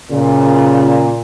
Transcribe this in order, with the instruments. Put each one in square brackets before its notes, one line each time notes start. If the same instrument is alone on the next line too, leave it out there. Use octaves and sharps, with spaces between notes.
[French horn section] A#2 [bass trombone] C#3